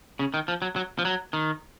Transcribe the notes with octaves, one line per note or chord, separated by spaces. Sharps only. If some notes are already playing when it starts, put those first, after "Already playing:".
C#3
D#3
F3
F#3
F#3
F3
F#3
D#3